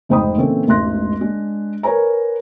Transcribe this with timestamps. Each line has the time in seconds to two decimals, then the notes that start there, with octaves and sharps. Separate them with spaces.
0.09 F1 G#2 C5 G5 B5 D#6
0.37 A#2 D3 E3 C4 C#4 A4
0.67 E1 A1 G#2 C6 F#6 A#6
1.21 G#3 D4
1.83 A#4 B4 C#5 G#5 A#5